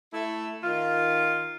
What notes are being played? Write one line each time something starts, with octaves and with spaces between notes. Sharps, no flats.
A3 E4 E5
D#3 F4